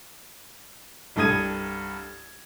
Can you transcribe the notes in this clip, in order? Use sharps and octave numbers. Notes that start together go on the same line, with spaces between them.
C2 G2 A4 D#6 G#6 D#7